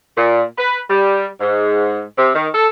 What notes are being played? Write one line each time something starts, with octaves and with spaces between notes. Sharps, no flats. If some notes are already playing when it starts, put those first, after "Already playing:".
A#2
B4
G3
G#2
C3
D#3
A4